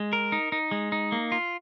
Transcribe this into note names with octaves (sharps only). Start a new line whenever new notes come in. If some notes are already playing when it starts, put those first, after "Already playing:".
Already playing: G#3
A#4
D#4
D#4
G#3
D#4
A#3
F4